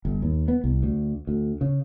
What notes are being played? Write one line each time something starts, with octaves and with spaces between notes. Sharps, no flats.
G1
D#2
B3
C2
D2
D2
C#3